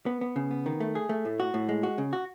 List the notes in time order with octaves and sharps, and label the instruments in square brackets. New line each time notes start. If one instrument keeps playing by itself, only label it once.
[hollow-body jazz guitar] B3
B3
C#3
B3
D#3
A3
G#4
A3
A2
F#4
A2
G#3
F#4
C#3
F#4